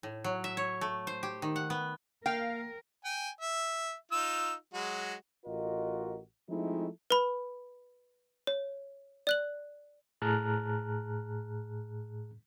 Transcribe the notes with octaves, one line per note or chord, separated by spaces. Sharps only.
A2
F#3
E5
C#5
A3
C5
G4
D#3
F#5
B3
A#3 A#4 F5 G5
G5 G#5
E5
D#4 F4 E6
F#3 G#3 F#4
A1 F4 F#4 A#4 D#5
F3 G#3 A3 C4 D#4 E4
B4 B5
C#5
D5 F#6 F#7
A2 G#4 A5 A#5 F6 F#6